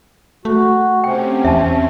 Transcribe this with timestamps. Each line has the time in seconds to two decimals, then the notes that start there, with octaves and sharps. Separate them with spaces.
0.45 A3 F#4
1.04 C3 C4 C#4 G5
1.45 E2 E5 A5